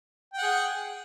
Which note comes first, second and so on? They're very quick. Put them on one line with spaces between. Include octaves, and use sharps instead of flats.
G5 F#5 G#4